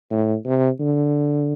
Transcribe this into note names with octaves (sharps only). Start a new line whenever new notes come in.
A2
C3
D3